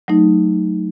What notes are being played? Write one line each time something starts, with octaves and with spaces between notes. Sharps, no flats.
F#3 A3 D#4